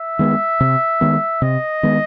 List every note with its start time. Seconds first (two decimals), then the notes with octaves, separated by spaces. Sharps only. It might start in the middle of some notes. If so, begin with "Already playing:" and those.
Already playing: E5
0.19 D#3 G#3 B3
0.60 C3
1.01 D#3 G#3 B3
1.42 C3 D#5
1.83 D#3 G#3 B3